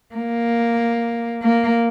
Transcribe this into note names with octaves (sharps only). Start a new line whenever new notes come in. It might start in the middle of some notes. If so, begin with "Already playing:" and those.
A#3
A#3